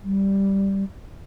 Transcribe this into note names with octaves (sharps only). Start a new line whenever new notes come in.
G3